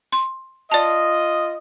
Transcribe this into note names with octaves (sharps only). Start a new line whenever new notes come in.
C6
F4 D5 D#5 A5